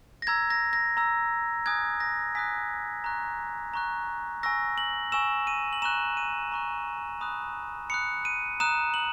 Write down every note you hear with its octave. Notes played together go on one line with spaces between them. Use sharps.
A#6
A#5 E6 G#6
A#6
A#6
A#5 E6
G#5 D#6 F#6 G#6
A#6
G#5 D#6 F#6 B6
A#5 C#6 F#6
A#5 C#6 F#6
G#5 C#6 E6 A#6
F#7
G#5 C#6 E6 E7
D#7
F#7
A#5 C#6 F#6 E7
D#7
A#5 C#6 F#6
B5 D#6 F#6
B5 D#6 F#6 C#7
D#7
A#5 D#6 F#6 E7
F#7